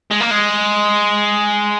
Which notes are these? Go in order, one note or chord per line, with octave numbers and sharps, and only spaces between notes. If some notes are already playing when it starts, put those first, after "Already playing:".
G#3
A#3
G#3